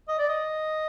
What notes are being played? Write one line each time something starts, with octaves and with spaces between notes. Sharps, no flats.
D#5
D5
D#5